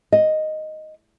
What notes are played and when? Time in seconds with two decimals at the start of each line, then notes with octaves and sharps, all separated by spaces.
0.12 D#5